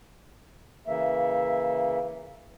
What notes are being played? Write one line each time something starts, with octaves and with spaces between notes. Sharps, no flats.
C#3 E3 A#3 E5